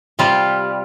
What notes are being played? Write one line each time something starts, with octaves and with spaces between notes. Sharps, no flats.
C3 G3 F4